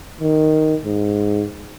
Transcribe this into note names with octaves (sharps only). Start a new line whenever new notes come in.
D#3
G#2